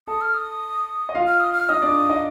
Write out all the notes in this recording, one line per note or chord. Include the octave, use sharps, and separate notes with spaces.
A4 A5 D#6
F6
D#6
D#5
F4 F5
F6
D#6
F6
D#4 D#5 D#6
D4 D5
D#4 D#5